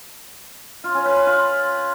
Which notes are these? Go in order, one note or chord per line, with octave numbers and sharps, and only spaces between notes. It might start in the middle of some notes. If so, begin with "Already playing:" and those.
F4
C#4
B4
B4
F4